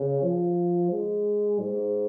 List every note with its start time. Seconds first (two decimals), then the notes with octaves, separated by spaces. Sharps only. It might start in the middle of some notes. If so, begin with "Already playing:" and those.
Already playing: C#3
0.22 F3
0.91 G#3
1.60 G#2